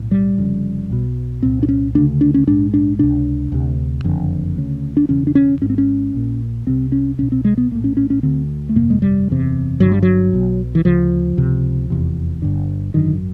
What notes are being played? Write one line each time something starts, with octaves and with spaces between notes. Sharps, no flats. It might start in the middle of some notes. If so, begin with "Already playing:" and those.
Already playing: B1 A2
G3
F1 F2 C#3
B1 B2
C2 A#2 C4
D4
C#4
D2 C#3 D4
D4
C#4
A#1 G#2 D4
D4
C#2 C3 D4
D2 C3
F#1 F2 D3
D2 C#3
D4
E1 E2 C#3 C#4
D4
C#4
G#1 G#2 C#4
C4
C#4
A#1 A#2
C2 C3 C4
C#4
C2 B2 C#4
C4
G#3
B3
A#1 A2 A#3
C#4
C#4
C#4
D2 D3 C4
A3
G1 F2 C3 A#3
G#3
G3
F#1 E2 C3
G1 G2 D3 F#3
G3
F#3
B1 B2
E3
D2 C#3 F3
C#2 C3
F1 E2 C3
G1 G2 D3
G#1 F#2 D3 D#3